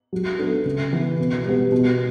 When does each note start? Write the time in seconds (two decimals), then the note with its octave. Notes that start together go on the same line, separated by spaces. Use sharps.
0.13 F#3
0.39 B3 D4 A4
0.66 C#3
0.93 E3 B3
1.18 B2
1.45 G3 B3
1.72 B2